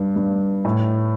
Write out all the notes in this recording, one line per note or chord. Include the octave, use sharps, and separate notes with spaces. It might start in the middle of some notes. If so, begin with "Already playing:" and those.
Already playing: G2
G2
A2